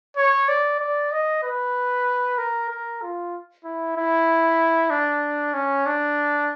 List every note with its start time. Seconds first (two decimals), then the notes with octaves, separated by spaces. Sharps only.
0.17 C#5
0.48 D5
0.80 D5
1.12 D#5
1.43 B4
2.38 A#4
2.69 A#4
3.02 F4
3.64 E4
3.97 E4
4.90 D4
5.54 C#4
5.86 D4